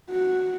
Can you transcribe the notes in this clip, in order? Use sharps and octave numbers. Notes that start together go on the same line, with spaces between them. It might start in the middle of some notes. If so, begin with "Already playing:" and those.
F#4